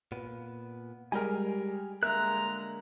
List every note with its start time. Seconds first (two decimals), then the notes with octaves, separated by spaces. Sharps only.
0.12 A#2 B3
1.12 G3 G#3 G4 A#4 G5 G#5
2.03 D3 G#3 A#3 A#4 E5 A#5 F#6